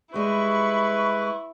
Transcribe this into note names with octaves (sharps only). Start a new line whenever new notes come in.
G3 G#3 E4 G4 B4 C#6